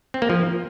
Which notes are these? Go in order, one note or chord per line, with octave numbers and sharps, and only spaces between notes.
C4
A#3
F3